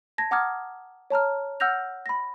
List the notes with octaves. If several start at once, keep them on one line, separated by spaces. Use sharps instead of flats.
A5 G#6 A#6
F#5 A#5 D6 D#6 F6 G#6
C#5 A5 A#5 F6
F#5 E6 F6 G6 A#6 F7
B5 A#6